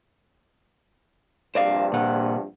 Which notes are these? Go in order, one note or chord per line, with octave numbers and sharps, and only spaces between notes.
A#1 G2 C3 C5 D5 F5
A#2 F#5